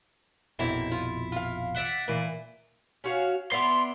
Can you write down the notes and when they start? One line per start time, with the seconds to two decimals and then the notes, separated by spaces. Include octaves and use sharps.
0.59 A#1 F2 B2 A#3 C4 E4 C#5
0.92 F4
1.32 F4 F5
1.75 D5 E5 F#5
2.08 A#2 E3
3.04 C#4 F#4 F5
3.52 B3 D4 E4 C6